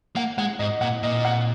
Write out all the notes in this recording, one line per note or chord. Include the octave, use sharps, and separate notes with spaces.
A#3 F#5
G#3 F#5
G#2 D#5
A#2 F#5
A#2 D#5
F#5